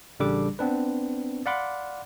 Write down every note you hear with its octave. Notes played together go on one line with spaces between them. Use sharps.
A1 C#3 G3 D4 A4 D6
B3 C4 D4 B4
D5 F5 F#5 B5 C6 D6